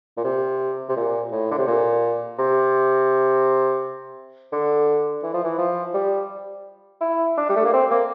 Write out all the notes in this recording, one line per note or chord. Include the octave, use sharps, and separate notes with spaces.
A#2
C3
C3
A#2
A2
D3
C3
A#2
C3
D3
E3
F3
E3
F3
G3
E4
D4
G3
A3
A#3
C4
A#3